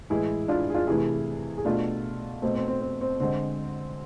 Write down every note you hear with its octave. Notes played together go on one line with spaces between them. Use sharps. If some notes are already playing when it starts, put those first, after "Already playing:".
A2 E3 G#3 E4 G#4
D4 F4
G#4
D4 F4
C3 E3 A3 E4 G#4
G#4
B2 A3 D4 F4
B2 A3 C4
C4
C4
C4
C4
D3 G#3 C4